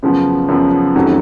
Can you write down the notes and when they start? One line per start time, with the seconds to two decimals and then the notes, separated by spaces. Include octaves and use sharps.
0.03 F#2 C#3 F3 B3
0.48 F#2 C#3 F3 B3
0.95 F1 F2 D#3 F#3 C#4